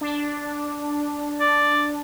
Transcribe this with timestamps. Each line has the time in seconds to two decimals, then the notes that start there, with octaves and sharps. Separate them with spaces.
0.01 D4
1.40 D5